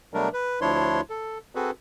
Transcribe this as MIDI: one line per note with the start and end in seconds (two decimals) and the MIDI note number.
0.14 0.29 47
0.14 0.29 54
0.14 0.29 55
0.14 0.29 57
0.14 0.29 62
0.14 0.29 70
0.33 0.60 71
0.61 1.01 38
0.61 1.01 53
0.61 1.01 62
0.61 1.01 64
0.61 1.01 73
0.61 1.01 84
1.10 1.38 69
1.55 1.71 60
1.55 1.71 66
1.55 1.71 68
1.55 1.71 69
1.55 1.71 71